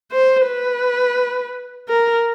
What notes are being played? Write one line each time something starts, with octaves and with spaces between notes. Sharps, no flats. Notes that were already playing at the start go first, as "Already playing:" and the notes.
C5
B4
A#4